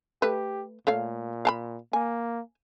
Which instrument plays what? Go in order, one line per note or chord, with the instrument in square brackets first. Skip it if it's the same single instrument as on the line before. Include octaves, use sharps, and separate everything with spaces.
[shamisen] A3 B4 [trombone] G4
[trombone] A#2 [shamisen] A3 C#5 F5
[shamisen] F5 A5 B5
[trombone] A#3 [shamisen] G#5